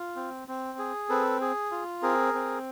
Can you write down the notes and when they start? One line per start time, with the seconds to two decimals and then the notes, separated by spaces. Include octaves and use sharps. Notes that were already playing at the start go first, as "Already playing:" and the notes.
Already playing: F4
0.16 C4
0.48 C4
0.79 G#4
1.09 C4 A4 B4
1.41 G#4
1.72 F4
2.02 C4 G#4 A#4
2.34 C4